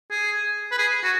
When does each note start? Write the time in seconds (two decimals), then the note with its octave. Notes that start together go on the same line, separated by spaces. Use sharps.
0.11 G#4
0.72 B4
0.78 G#4
1.04 F#4